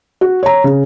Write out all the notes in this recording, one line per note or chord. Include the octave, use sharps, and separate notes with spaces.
F#4
C#5 A#5
C#3